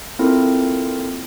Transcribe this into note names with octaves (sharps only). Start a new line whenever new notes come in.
A#3 C4 E4 F4 A4 A#4